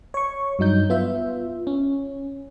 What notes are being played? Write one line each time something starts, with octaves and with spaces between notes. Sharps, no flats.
C#5 C#6
G2 F#3 D#4 G6
B3 F4 E5
C#4